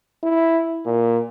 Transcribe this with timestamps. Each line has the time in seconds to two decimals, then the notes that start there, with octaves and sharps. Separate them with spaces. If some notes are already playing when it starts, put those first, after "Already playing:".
0.23 E4
0.86 A#2